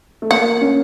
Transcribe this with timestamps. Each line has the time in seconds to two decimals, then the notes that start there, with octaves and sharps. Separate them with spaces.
0.22 A3
0.31 A#3 F#5
0.61 C#4